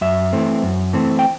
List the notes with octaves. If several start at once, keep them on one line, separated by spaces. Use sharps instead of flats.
F#2 E5
E3 A3 C4
F#2
E3 A3 C4
G5